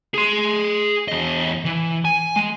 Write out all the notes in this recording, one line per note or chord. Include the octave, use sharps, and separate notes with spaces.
G#4 C6
E2 D#5
E3
G#5
G#3